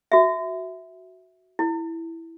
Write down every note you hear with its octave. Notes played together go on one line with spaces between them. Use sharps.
F#4 E5
E4